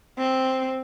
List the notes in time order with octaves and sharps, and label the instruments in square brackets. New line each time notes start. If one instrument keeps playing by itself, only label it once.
[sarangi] C4